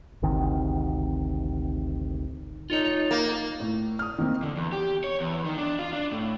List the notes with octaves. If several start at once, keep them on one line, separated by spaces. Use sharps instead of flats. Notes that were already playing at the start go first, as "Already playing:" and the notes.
G#1 D2 C3 D#3
D#4 F4 A4 C#5
A#3
A2
D#6 F6
D#3 A#3 C4
D3
E2
G4
C#5
E2
D#3
D4
F4
D4
A2